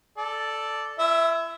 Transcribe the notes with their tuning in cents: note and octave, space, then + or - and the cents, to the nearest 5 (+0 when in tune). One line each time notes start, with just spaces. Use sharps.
A4 +0 D5 +0
E4 +35 E5 +0